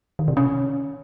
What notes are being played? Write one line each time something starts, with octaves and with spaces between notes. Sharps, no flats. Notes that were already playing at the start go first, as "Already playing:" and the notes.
D#3
C3
C#4